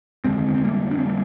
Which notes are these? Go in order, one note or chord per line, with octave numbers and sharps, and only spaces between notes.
F1 D#2 D3 G#3 C4
C4
G3 A#3
D4
C4
G3 A#3